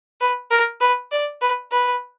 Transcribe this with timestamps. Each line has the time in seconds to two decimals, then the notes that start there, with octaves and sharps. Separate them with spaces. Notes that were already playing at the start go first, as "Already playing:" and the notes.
0.21 B4
0.51 A#4
0.81 B4
1.12 D5
1.42 B4
1.72 B4